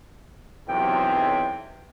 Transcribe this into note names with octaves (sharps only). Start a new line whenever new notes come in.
B1 E2 C3 G5